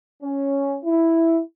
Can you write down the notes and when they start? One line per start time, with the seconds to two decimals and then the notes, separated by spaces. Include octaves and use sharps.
0.23 C#4
0.85 E4